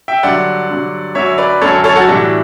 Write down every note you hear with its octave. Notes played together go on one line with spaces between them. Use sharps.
E5 G5
G2 D3 F#3 D5 F#5
G2 D3 F#3
F#2 D3 F#3 C#5 E5
B4 D5
F#2 D3 F#3 A4 C#5
A4 C#5
F#4 A4
A2 E3 G3 D4 F#4